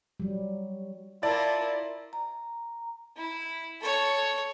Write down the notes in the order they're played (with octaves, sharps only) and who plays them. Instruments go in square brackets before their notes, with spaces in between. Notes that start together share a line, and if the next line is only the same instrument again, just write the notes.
[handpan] F#3 G3
[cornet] E4 [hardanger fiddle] F4 A#4 [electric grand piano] D5 A6 [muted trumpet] A5
[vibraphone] A#5
[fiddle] E4
A4 C#5